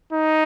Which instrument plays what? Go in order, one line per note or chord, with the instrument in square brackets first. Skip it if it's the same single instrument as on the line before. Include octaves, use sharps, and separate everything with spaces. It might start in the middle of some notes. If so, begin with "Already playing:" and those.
[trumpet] D#4